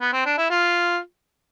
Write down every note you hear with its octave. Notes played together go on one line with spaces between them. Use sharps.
B3
C4
D4
E4
F4